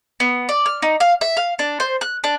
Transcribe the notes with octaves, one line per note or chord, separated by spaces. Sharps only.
B3
D5
F6
D#4
F5
E5
F5
D4
C5
F#6
D4